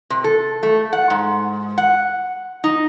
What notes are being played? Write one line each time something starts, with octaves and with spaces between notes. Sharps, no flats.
C3
A4
A3
F#5
G#2
F#5
D#4